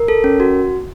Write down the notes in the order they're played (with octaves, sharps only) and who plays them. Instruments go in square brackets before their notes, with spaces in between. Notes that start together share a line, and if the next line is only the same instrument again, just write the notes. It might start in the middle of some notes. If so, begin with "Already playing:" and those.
Already playing: [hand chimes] A#4
A4
C#4
F#4